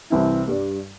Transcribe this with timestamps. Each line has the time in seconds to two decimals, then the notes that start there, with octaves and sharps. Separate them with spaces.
0.10 C2 C3 E3 C4 E4
0.48 G2 G3 D4